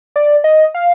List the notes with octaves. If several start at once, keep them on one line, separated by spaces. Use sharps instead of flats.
D5
D#5
F5